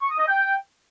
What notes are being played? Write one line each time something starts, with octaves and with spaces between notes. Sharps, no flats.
C#6
D#6
D#5
G5